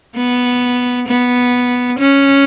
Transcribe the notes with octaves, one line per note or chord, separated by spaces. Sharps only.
B3
B3
C#4